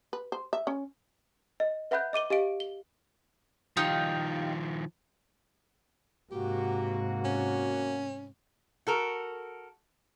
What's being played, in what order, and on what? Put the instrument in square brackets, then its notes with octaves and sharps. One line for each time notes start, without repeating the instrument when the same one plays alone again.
[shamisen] B4
C5
E5
C#4
[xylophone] D#5
B4 E5 F#5 B5 F#6 G6
D#5 D6 D#7 G7
G4 D#5 F5 D7
G7
[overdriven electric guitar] D#3 F3 [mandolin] D#4 F4 G4
[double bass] G#2 C3 [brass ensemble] A#3 F#4 [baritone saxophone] G4
[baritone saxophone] C#4
[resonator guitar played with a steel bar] F#4 A4 A#4